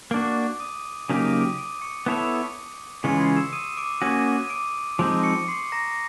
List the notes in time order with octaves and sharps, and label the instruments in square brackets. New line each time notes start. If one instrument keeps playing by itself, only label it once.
[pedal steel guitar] A#3 D4 F#4 [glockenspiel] D6 D7
[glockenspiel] D#6 D#7
[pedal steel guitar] C#3 F#3 A#3 D#4 G4 [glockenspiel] D#6 D#7
[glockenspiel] D#6 D#7
D6 D7
D6 D7
C#6 C#7
[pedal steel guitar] B3 E4 A4 C#5
[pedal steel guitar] C#3 E3 G#3 C#4 F4 [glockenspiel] C#6 C#7
[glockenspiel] C6 C7
E6 E7
D#6 D#7
D6 D7
[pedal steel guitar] A#3 C#4 F#4 [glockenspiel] D#6 D#7
[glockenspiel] D#7
D6 D7
[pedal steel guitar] F3 G#3 C4 D#4 [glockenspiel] D6 D7
[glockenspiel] C#6 C#7
C6 C7
A#5 A#6